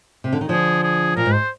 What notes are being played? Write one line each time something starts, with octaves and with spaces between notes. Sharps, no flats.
C3
D3
D#3
D3 F3 G#4
G#4
A#2 A#4
G#2
C5